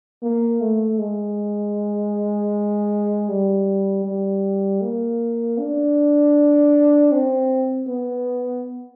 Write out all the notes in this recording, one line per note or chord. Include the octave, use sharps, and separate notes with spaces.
A#3
A3
G#3
G3
G3
A#3
D4
C4
B3